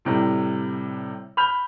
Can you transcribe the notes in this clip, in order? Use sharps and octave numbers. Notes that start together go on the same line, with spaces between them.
A2 C3 G3
B5 F6 G6 F7